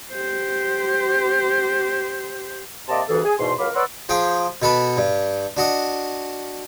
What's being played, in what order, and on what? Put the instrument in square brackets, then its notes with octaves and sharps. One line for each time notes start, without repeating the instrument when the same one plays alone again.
[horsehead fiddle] G4 C5
[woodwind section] C3 A#3 D5 D#5 A5 C6
D2 G2 E3 G#4 A4
G#4 G#5
E2 G#2 B2 C6
C#2 F#3 A#4 F5 B5 D6
B4 C#5 D5 F#5 C6 E6
[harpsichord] F3 G#4 G5
B2 A4 B4
G2
D4 F#4 D#5